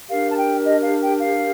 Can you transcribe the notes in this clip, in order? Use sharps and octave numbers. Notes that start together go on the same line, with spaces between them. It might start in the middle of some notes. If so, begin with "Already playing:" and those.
D4 G4 A#4 F5
A5
G5
D#5
F5
G5
F5